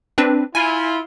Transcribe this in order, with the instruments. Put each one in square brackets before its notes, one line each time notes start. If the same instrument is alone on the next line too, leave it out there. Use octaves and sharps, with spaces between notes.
[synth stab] C4 D4 B4
[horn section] E4 F4 [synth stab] G#5